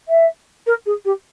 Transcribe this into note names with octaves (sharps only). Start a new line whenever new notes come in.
E5
A#4
G#4
G4